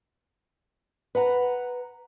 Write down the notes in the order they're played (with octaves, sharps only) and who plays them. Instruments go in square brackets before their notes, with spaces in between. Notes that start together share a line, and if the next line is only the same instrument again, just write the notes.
[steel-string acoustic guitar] B4 F#5 A#5